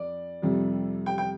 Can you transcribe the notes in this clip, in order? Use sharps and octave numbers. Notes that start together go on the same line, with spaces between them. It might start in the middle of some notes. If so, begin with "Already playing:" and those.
Already playing: F2 D5
F2 C3 G3
G5
G5